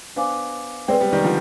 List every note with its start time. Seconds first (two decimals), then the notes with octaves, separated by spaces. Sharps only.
0.16 B3 D4 C5 F5 G#5 D6
0.88 G#3 C4 B4 D5 G5
1.00 G3 B3
1.13 D#3 G3
1.24 D3 F3